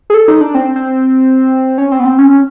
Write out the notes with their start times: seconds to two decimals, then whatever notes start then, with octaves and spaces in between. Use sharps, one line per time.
0.10 G#4
0.14 A4
0.28 D#4
0.41 D4
0.55 C4
0.76 C4
1.78 C#4
1.92 C4
2.00 B3
2.05 C4
2.19 C#4